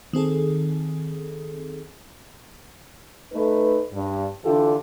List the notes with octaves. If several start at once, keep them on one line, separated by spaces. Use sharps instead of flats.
D#3 C4 G#4 A4
A3 D#4 A4 B4
G2
D3 E3 D4 F4 G4 A4